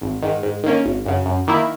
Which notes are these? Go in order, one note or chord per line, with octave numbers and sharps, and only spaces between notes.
G#1
G#2 D#3
G#2
D#3 A#3 C#4
G#1
F#2 C#3
F#2
D#3 A#3 E4